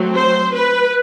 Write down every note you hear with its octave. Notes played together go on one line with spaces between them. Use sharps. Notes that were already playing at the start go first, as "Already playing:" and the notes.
Already playing: F#3 A3 C4
C5
B4